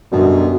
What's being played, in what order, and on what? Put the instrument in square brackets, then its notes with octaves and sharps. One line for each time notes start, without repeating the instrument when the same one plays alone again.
[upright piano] F#2 D3 G3 [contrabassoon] B2